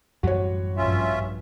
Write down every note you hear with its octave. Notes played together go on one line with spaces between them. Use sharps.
A1 F#2 G3 F#4 C#5
A#1 G2 C#4 F4 E5